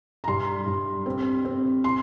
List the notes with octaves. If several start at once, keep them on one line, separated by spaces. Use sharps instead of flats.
A#5
G2 C6
G2
C4
C4
C6